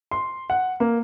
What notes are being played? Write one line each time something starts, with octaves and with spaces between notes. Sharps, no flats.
C6
F#5
A#3